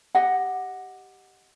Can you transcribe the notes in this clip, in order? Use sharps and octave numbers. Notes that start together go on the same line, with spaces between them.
G4 D#5 F#5